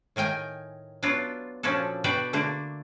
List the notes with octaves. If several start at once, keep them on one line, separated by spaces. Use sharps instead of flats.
A2 D#3 A#4 G5 G#5
F#3 B3 D4 F4
A#2 F3 C#4 D4 F#4 A4
B2 D4 F#4 B4 D5 G5
D3 A3 A#3 D4